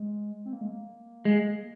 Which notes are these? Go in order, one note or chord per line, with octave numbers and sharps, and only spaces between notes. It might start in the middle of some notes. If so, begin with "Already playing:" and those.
Already playing: G#3
C4
A#3
G#3
A#3
G#3